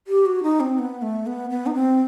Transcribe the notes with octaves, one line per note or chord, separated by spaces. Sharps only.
G4
F#4
D#4
C4
B3
A3
B3
B3
D#4
C4